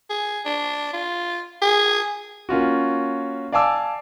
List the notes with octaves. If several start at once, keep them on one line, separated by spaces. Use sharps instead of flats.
G#4
D4
F4
G#4
A#3 C#4 F4 F#4
D5 F5 G#5 A5 D6 E6